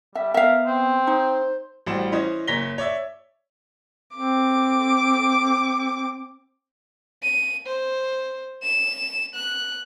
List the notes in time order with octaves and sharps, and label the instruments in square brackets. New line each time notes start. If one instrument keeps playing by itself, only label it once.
[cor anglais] G3 [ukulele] E5
[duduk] B3 [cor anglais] A#4 [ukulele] E5 F5
[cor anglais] C4
[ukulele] D#4 [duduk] C5
[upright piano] A1 G3 F#4 C5 E7
E3 C#4 C5 C#5 D#5
F#1 C#5 A#5 A#6 B6 G7
C#5 D5 E5
[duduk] C4 [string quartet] D6
[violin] D#7
C5
E7
F#6